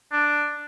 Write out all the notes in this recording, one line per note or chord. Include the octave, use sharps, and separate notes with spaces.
D4